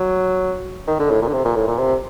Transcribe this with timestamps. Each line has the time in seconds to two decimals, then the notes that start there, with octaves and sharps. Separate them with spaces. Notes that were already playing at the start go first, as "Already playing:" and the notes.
Already playing: F#3
0.87 D#3
1.00 D3
1.10 A2
1.22 A#2
1.28 D3
1.34 C3
1.45 A#2
1.56 A2
1.68 A#2
1.78 C3